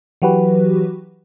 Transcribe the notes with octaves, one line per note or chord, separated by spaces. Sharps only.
E3 F#3 F#4 G4 B4